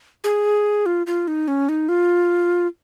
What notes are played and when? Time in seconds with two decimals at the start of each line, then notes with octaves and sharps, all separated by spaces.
0.24 G#4
0.86 F4
1.07 F4
1.28 D#4
1.48 C#4
1.69 D#4
1.89 F4